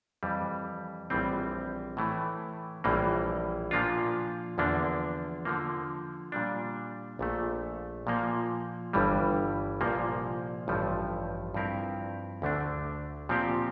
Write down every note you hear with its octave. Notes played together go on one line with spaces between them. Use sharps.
F2 E3 G3
A#1 A2 E3 G3 C4
A2 E3 A3
A#1 A2 E3 G3 A#3
A#2 F3 A#3 D4 F4
E2 D3 F3 A#3 D4
D3 F3 A#3
A#2 G3 D4
A#1 A#2 A3
A#2 F3 A#3
G1 G2 E3 G3
C2 A#2 F3 A#3
A1 G2 F3 A3
G2 F3 C4 E4 A#4
D2 D3 A3 D4
A#2 F3 C4 G4